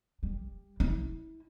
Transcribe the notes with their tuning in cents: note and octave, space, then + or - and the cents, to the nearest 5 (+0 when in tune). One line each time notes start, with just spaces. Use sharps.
G3 +20
E4 -30